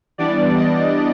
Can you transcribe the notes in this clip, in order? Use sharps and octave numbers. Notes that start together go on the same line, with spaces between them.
E3 G3 B3 D4 D5
D#5